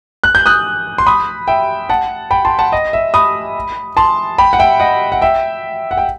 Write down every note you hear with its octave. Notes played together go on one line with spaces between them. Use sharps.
F#6
G6
D#6 F#6
C6
B5 D#6
E5 G5
F#5 A5
G5 B5
A5 C6
F#5 A5
D#5
E5
B5 D#6
A5 C6
G5 B5
F#5
E5 G5
D#5 F#5
F#5
E5 G5
F#5
G5